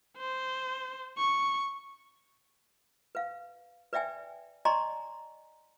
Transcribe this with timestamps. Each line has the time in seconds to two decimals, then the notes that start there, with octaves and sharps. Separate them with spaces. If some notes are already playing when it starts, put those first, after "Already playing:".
0.18 C5
1.18 C#6
3.15 B4 F5
3.93 B4 D5 E5 G5 G#5
4.65 D5 D#5 G#5 A#5 C6 C#6